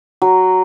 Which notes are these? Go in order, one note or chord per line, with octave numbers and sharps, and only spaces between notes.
F#3